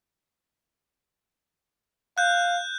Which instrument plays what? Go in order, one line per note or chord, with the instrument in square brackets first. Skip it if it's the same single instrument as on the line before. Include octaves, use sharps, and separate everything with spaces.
[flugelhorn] F5 [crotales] F#6 G6